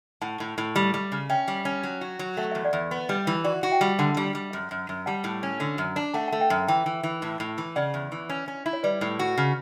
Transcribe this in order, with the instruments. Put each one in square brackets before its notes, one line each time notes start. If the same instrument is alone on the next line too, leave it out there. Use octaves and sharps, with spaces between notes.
[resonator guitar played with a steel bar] A2 [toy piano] F#5 A5
[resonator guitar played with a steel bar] A2
A2
G3
G3
C#3
[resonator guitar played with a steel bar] C#4 [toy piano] E5 G5
[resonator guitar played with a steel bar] G3
C#4
F#3
F#4
F#3
[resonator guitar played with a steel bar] A3 [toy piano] F#5
[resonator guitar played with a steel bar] E2 [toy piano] E5
[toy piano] D5 F#5
[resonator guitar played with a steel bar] E2
B3
G3
E3
[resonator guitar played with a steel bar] F#4 [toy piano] D5 F#5
[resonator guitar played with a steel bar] F#4
[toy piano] E5 G5
[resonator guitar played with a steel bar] G3
[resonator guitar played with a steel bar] D3 [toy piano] F#5 A5
[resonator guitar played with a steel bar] G3
G3
F#2
F#2
F#2
[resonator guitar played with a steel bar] G3 [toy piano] F#5 A5
[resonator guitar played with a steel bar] A2
C#4
D3
F#2
D4
[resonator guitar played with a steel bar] A3 [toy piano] F#5 A5
[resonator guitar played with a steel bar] A3 [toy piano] F#5 A5
[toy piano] E5 G5
[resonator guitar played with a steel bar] F#2
[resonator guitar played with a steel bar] E3 [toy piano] E5 G5
[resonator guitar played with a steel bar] E3
E3
A2
A2
E3
[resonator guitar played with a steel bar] C#3 [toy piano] D5 F#5
[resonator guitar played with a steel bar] E2
E3
C#4
C#4
E4
[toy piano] C#5
[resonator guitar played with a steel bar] G3 [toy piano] B4 D5
[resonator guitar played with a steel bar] A2
F#4
C#3